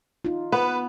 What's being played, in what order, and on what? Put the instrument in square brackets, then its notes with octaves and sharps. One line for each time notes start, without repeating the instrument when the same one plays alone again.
[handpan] D#4 F4
[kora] B3 [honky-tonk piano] B4